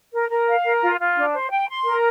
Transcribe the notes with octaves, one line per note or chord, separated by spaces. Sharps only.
A#4
A#4
F5
A#4
F4
F4
D4
C5
G5
C6
A#4